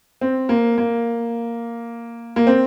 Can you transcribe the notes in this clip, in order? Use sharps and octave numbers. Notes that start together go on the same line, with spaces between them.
C4
A#3
A#3
A#3
C4